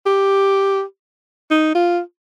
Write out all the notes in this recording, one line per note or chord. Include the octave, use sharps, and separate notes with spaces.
G4
D#4
F4